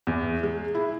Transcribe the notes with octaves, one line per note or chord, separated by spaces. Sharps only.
E2
G#3
E4